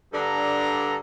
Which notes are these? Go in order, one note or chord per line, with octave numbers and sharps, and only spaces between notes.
G2 D3 D4 A4 A#5